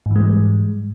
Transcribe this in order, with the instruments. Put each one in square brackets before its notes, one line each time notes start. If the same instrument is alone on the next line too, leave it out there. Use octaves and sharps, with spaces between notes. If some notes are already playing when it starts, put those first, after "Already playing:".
[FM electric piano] G#2
E3
G#3
G3